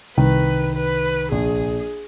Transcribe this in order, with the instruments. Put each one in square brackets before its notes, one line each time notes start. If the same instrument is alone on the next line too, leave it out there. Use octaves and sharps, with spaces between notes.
[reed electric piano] C2 [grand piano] D#3 [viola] B4
[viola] B4
[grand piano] A#1 [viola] G#4